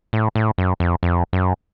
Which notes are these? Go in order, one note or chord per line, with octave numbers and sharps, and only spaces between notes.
A2
A2
F#2
F2
F2
F#2